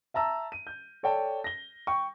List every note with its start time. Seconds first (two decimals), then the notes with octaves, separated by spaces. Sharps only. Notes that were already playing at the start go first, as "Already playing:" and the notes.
0.14 E5 A5 A#5 E6
0.52 D#7
0.67 G6
1.03 A4 C#5 D5 G5 A5
1.44 A#6 G7
1.87 G5 C#6